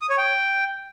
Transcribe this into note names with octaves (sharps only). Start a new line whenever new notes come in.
D#6
C#5
G5